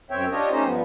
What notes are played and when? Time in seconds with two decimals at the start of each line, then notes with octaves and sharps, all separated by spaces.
0.11 F#2 C4 C#5 E5 G5
0.31 D4 F4 G4 C#5 D#5
0.51 A3 C#4 D#4 G4 C5 D#5
0.66 G2 F3 B3